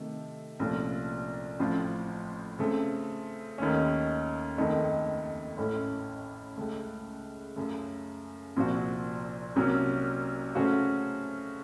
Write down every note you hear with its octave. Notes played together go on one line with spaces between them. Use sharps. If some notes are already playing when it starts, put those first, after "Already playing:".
Already playing: C3 D#3 A3
C2 A#2 F3 A3 C#4
A1 A2 F3 C4 F4
C#3 A3 C4
D#2 D#3 A3 C#4
F#1 F2 D#3 A3 D#4
A1 A2 A3 C#4 A4
C#2 C#3 A3
F#2 C#3 A3
C2 A#2 F3 C4 F#4
C2 C3 F#3 A#3 C#4
C#3 A3 C#4 F#4 C5